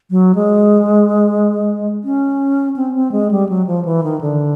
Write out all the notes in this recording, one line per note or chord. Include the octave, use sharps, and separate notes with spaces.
F#3
G#3
C#4
C4
C4
G#3
G3
F#3
F3
E3
D#3
D3